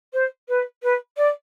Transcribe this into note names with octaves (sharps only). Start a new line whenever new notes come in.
C5
B4
B4
D5